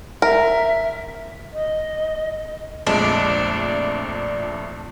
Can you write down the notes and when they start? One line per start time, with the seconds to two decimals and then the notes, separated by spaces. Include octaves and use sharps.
0.22 A#4 E5
1.53 D#5
2.87 A#1 F2 G#3 A3 D4